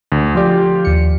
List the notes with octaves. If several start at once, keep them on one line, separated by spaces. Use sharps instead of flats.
D2
F3 F4 G4 D5
D#2 C#7